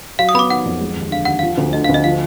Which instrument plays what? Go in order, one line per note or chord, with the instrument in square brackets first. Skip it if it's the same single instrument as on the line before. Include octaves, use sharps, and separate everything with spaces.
[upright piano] F#3 [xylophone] F5
[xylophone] D#6
[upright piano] B3 [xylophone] B5
[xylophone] D6
[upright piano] D#3 [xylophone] F#5
[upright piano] F2
G#3
D#2
[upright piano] D3 [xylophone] F5
[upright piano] D#2 [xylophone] F#5
[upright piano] F3 [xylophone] F5
[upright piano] D2
[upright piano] D3 [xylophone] D#5
[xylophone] F5
[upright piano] D2
[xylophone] D#5
[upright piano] F3 [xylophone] F5